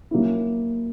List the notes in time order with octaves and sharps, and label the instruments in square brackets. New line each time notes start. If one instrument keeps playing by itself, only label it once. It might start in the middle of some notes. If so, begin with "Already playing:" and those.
[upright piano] F#3 A#3 C#4 E4